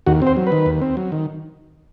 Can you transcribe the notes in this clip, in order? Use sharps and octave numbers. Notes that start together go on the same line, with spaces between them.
D#2 F#4
C4 C5
F#3
B4
D#3
D#2
C4
F#3
D#3